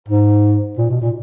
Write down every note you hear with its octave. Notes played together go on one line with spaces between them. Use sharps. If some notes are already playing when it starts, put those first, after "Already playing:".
G#2
A#2
B2
A#2